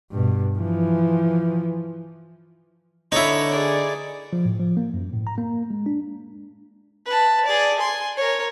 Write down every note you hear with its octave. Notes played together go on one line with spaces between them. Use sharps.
G2 B2
E3 F3
D3 D#4 E4 C#5
G#4 D5
F3
A2
F3
A#3
F#2
A2
A#5
A#3
G#3
D4
B4 A5
G#4 D5
G#5 C6
A#4 C#5